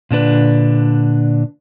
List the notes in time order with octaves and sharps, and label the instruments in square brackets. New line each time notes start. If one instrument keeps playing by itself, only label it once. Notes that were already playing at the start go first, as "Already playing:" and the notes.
[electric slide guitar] A#2 D3 D4 B4